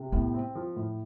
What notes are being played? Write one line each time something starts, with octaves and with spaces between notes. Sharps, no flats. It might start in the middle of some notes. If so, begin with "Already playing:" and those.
Already playing: C3
A2 B3
C4
F3
A2